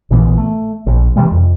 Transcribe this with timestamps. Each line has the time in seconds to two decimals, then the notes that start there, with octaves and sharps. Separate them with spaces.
0.11 A#1 A#2 E3 B3
0.37 A3
0.86 A#1
1.16 C3 E3 G3 G#3
1.32 F2